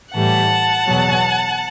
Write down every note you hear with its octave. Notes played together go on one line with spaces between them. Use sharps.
A2 E3 G3 F#5 A5
E2 B2 F#3